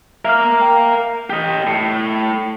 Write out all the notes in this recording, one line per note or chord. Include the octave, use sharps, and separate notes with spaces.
A#4 E5 F5 F6
G5
G4 D#5
A2